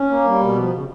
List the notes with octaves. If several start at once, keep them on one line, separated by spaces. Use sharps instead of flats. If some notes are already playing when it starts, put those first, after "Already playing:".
Already playing: C#4
A#3
G3
B2
F3
C#3